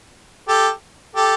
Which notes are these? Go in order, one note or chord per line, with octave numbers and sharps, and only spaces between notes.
G4 A4
G4 A4